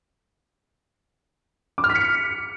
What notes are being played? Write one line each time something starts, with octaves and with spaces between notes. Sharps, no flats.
D6
F6
B6
C#7